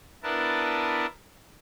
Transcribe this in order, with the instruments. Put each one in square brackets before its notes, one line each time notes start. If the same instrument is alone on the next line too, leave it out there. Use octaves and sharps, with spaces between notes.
[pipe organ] B3 D4 E4 A#4 B4 A5